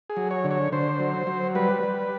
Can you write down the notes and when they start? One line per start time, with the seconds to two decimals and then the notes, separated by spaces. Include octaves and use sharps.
0.10 G#4
0.17 F#3
0.31 C#5
0.44 D3
0.51 C#5
0.72 D3 C5
1.00 F#3
1.27 F#3
1.55 G3 B4
1.83 G3